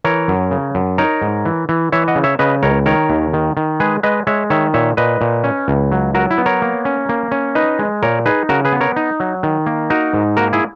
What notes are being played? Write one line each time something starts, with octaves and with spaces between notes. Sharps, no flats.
E3 A#4 C#5
F#2
C#3
F#2
D#4 A#4 C#5
G#2
E3
E3
E3 C#5 E5
D#5 F#5
C#3
C#5 E5
C#3 B4 D#5
C#2 A#4 C#5
D#3 A#4 C#5
D#2
D#3
D#3
G#3 G#4 B4
G#3 B4 D#5
G#3 C#5 E5
D#3 C#5 E5
A#2 C#5 E5
A#2 B4 D#5
A#2
C#4
C#2
F#3
F#3 F#4 A#4
E4
B3
A#4 C#5
A#3
C#4
A#3
C#4
D#4 B4 D#5
G#3
A#2 A#4 C#5
D#4 G#4 B4
C#3 F#4 A#4
G#4 B4
B3
A#4 C#5
D#4
F#3
D#3
A#3
D#4 F#4 A#4
G#2
A#3 F#4 A#4
E4 G#4